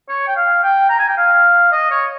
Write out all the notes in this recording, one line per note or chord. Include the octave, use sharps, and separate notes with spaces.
C#5
G5
F5
G5
A#5
G#5
G5
F5
D#5
C#5